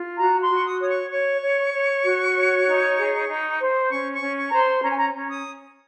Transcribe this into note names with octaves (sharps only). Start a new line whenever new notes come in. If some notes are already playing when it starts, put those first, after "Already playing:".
Already playing: F4
F#4 A#5
C6
F#4
C#6
D#6
C#5 D#6
C#6
C#5 C#6
C#5
C#5
F#4
C#5
D#4
G#4
D#4
C5
C#4 C#6
C#6
C#4
C#6
C5 A#5
C6
C#4 A#5
G#5
A#5
C#4
D#6